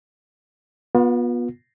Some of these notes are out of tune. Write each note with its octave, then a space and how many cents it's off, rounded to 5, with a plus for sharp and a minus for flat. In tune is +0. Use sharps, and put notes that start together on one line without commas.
B3 -25 F4 +35